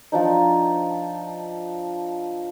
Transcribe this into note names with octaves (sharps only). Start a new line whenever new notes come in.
F3 D4 D#4